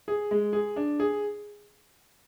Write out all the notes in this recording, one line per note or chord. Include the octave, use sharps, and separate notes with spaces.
G#4
G#3
G#4
D4
G#4